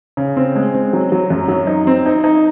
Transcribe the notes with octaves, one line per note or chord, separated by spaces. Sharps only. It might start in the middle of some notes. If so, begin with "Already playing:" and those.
C#3
C4
G#3
C4
F#3
F#3
F#2
F#3
D#4
C4
D#4
D#4